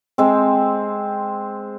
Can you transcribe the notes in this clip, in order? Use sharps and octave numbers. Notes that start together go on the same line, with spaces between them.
G#3 C4